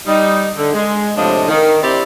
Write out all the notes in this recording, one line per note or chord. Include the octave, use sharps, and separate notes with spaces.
G3 D#4
D3
G#3
A2 C3 F3 D4 D#5
D#3
C4 D4 E4 G4 D5